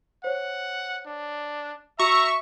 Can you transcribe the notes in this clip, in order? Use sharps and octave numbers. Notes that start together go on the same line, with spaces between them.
C5 C#5 F#5
D4
F#4 E5 A#5 C#6